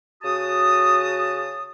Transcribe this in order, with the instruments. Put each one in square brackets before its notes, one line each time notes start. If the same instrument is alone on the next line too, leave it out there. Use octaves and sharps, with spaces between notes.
[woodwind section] C#3 F#4 A5 D#6